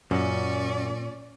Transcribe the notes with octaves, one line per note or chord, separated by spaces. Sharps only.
F#2 A#2 C#4 D5